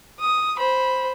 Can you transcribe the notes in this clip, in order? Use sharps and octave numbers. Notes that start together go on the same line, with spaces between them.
D#6
C5 B5